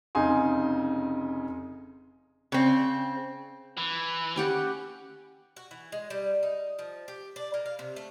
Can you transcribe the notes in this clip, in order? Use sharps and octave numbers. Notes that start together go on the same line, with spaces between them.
F1 C#3 D#4 G#5 C6
C#3 C4
E3
C#4 G4 F#5
F#4
E3
G#3
G3
D#4
F3
G4
D4
A#3
F5
C3
A3